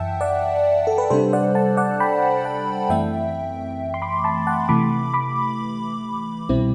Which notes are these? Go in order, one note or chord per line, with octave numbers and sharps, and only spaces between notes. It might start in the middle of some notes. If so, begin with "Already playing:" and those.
Already playing: F#2 E3 E5 F#5 G5 A5
D5 F#5
A4
B4
C3 G3 D4 A4 C5
D5 F#5
F#5 A5
D5 F#5
G5 B5
F#5 A5
F#2 E3 A3 C4 E5 G5
C6
B5 D6
A5 C6
F#5 A5
C3 E3 A3 B5 D6
B5 D6
C2 B2 G3 C4 E4